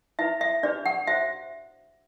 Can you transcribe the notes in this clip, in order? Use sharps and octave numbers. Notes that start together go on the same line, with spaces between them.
E4 B4 E5
E5
D4 G4 B4 D5
F#5
F#4 C5 E5